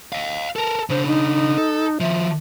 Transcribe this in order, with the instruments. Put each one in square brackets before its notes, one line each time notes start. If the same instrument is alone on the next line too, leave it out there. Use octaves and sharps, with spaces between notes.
[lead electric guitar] D#5 F5
[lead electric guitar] A4 A#4 [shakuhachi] A5
[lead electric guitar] C#3 D4 [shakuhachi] C5
[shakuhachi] D#4
[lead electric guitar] A4
[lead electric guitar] D#3 F3 [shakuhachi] E5